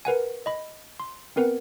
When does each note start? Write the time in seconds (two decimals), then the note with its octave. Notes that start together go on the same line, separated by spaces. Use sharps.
0.05 A#4 B4 F#5 G#5
0.46 D#5 B5
1.00 C6
1.36 B3 C4 A#4 B4 F#5